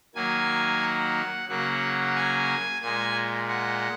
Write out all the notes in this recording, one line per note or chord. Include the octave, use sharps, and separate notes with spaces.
D#3 F#3 A#3 G#5
F#5
C#3 F#3 A#3 F#5
G#5
A#2 G#3 G#5
F#5